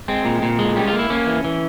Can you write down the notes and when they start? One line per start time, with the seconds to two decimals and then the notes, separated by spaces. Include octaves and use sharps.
0.08 G#3 C4
0.25 A#2
0.42 A#2
0.59 G#3
0.76 G3 C#4
0.87 F4
0.93 A#3
0.99 E4
1.10 A#3 C#4
1.27 E3
1.44 E3